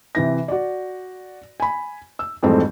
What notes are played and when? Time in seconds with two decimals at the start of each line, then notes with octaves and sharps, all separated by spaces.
0.15 C3 E3 A#6
0.48 F#4 D5
1.60 G#5 B5
2.19 E6
2.43 F2 G#2 E3 G3 A3 C4